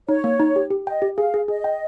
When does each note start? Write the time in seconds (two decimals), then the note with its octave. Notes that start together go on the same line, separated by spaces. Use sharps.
0.09 D#4 C#5
0.24 A#3
0.40 D#4
0.56 G4
0.71 G4
0.86 D#5 G5
1.02 G4
1.17 G#4 F5
1.34 G#4
1.48 G#4 D#5
1.64 G5